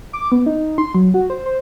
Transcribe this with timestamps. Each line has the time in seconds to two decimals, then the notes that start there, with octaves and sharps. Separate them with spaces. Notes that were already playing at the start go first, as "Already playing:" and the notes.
0.13 D6
0.32 B3
0.46 D#4
0.78 C6
0.95 F#3
1.14 F#4
1.30 C5
1.46 C5